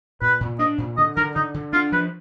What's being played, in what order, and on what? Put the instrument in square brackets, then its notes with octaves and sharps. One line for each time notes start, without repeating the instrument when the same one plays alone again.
[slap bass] A#2 [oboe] B4
[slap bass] A#2
[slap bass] D4 [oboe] D#5
[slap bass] A#2
[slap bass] D3 [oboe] D#5
[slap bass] D3 [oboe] A#4
[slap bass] D3 [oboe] D#4
[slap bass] D3
[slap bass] D4 [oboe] F4
[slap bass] F3 [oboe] B4